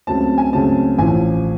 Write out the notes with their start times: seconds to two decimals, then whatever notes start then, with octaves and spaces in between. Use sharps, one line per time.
0.07 C#2 C#3 F#3 A3 C4 A5
0.38 G#5
0.53 C#2 C#3 F#3 A3 C4 A5
0.98 A1 A2 F3 G#5